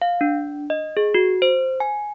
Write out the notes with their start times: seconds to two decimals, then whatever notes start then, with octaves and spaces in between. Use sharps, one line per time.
0.02 F5
0.21 D4
0.70 D#5
0.97 G#4
1.14 F#4
1.42 C5
1.80 G#5